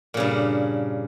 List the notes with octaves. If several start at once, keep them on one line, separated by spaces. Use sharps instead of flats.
G2 A#2 C#3